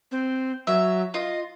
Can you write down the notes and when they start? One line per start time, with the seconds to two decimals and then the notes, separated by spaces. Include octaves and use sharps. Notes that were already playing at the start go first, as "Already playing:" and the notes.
0.11 C4
0.67 F#3 E5
1.14 F4 D#5